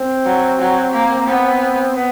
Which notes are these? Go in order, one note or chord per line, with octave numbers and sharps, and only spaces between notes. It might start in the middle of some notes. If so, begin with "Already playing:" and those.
Already playing: C4
F#3
F#3
A#3
B3
B3